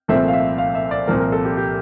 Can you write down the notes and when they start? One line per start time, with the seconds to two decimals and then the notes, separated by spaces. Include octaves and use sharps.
0.08 C2 A#2 F3 A3 C4 E5
0.28 F5
0.33 E5
0.58 F5
0.75 E5
0.91 D5
1.07 C2 A#2 F3 C4 A#4
1.20 A#4
1.32 A4
1.45 G4
1.57 G4